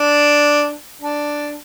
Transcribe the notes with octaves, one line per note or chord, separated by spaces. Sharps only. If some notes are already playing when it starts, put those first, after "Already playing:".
Already playing: D4
D4